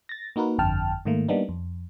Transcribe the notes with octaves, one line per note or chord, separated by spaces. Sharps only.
A6 A#6
A#3 D#4 F#4 A#4 B4
G1 F2 D3 G5 A5 F6
G#2 D#3 A3 A#3
G3 A#3 B3 D4 D#4
F2